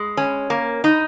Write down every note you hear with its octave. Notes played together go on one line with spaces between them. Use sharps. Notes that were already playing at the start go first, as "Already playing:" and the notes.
Already playing: G#3
C#4
A#3
D#4